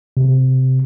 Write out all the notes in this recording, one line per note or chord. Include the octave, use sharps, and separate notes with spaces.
C3